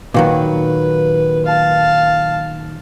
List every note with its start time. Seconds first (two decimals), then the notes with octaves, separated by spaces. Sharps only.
0.14 A#2 D#3 F#3 B4
1.46 F5 A5